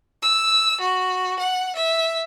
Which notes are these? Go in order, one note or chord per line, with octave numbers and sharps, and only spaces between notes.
E6
F#4
F#5
E5